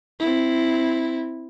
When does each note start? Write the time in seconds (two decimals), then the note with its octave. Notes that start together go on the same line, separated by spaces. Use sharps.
0.20 C4 E4